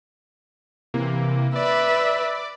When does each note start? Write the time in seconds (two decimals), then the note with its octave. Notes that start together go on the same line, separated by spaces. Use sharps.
0.94 C3 E3 A#3
1.56 B4 D5 E5